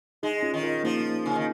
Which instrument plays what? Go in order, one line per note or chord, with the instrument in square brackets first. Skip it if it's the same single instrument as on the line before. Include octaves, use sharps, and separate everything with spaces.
[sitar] G#3 [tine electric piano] D#4 G#4
[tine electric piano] C#4 F4
[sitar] D#3
[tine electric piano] F4 A#4
[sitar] F3 [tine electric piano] A#3 D#4
[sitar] C#3
D#3